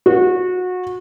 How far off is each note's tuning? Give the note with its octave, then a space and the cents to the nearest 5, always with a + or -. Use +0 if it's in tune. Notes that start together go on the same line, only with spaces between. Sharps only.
F#4 -25